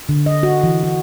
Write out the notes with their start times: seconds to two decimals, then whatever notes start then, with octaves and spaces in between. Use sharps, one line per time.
0.09 D3
0.26 D#5
0.43 F#4
0.63 E3
0.83 F#4